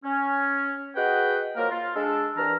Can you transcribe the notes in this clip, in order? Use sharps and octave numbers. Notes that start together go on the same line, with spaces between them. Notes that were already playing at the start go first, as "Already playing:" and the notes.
C#4
F#4 G#4 B4 D#5 F#5 G5
F3 F#3 A#3 A#4
F4
G#3 D4 A4
C2 G2 E3 D4 A#5 F6